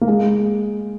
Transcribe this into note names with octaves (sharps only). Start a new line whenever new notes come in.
A#3
G#3